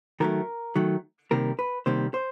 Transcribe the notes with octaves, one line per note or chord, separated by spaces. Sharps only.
D#3 F#3 A3 A#4
D#3 F#3 A3
C3 D#3 G3 A#3 A#4
B4
C3 D#3 G3 A#3 C5
C5